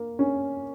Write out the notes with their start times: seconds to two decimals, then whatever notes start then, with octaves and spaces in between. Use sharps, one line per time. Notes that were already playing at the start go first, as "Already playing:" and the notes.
Already playing: A#3
0.19 C#4